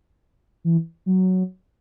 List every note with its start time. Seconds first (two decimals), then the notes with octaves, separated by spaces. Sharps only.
0.64 E3
1.06 F#3